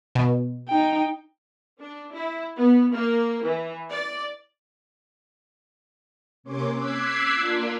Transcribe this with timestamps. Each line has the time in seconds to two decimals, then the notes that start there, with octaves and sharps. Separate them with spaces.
0.15 B2
0.68 D#4 G5
1.80 D4
2.13 E4
2.56 B3
2.93 A#3
3.44 E3
3.90 D5
6.43 C3 A#3 C#4 C#5 C6 D6
6.74 D6 E6 F#6 G#6 B6 C7
7.34 A#3 D4 F4